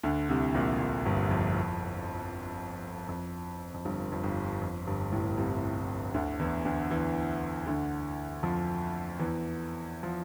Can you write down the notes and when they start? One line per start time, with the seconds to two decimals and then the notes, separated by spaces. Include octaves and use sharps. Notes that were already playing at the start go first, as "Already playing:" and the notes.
0.03 D2 D3
0.29 C2 C3
0.55 A#1 A#2
0.80 A#1 A#2
1.05 G1 G2
1.31 F2
3.09 F2
3.74 F2
3.85 G1 G2
4.12 F2
4.23 G1 G2
4.62 F2
4.87 G1 G2
5.12 A1 A2
5.38 C2 C3
6.14 D2 D3
6.39 E2 E3
6.65 D2 D3
6.90 E2 E3
7.67 D2 D3
8.43 F2 F3
9.19 E2 E3
10.03 F3